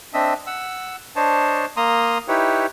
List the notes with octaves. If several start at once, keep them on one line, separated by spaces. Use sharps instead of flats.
C4 D4 D#5 E5
F#5 E6
D4 C5 C#5 D#5 A5
A#3 A#5 C6 D#6
D#4 E4 G4 B4 C#5